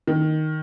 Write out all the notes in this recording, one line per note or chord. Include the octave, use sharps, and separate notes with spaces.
D#3